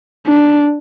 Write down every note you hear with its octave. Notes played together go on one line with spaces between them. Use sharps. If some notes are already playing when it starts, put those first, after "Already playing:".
D4